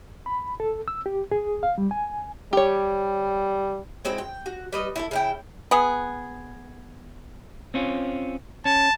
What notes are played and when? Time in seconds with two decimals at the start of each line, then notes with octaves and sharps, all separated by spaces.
0.26 B5
0.60 A4
0.88 E6
1.06 G4
1.32 G#4
1.63 F5
1.78 G3
1.91 G#5
2.53 G3 G4 C#5
4.05 G#3 C4 E4 F#4
4.18 G5
4.46 F#4
4.73 G3 B4 D#5
4.96 E4 F4 A4
5.11 C#3 E4 G5
5.71 B3 G#4
7.74 C4 C#4 F4
8.65 C#4 A5